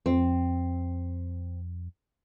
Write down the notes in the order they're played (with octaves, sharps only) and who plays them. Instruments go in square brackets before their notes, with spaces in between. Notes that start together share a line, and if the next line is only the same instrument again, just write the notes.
[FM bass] F2 [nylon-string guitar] C4